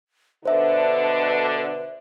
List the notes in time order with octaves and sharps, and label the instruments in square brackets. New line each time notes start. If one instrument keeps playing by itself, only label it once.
[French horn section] B2 D3 D4 [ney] B4 [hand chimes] C5 E5